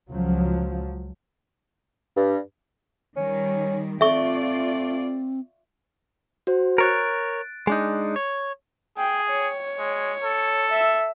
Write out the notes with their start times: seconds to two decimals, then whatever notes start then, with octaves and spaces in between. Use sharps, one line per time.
0.11 C#2 F3 F#3
2.17 G2
3.16 D#3 G3 C#4
4.01 A3 C4 F4 D5 E5 C#6
6.47 F#4 C5
6.78 A#4 C#5 F#6 A6 D7
7.67 G#3 D4 D#4
8.16 C#5
8.98 G#4 G5
9.31 C#5
9.79 G#3
10.24 A4
10.72 E5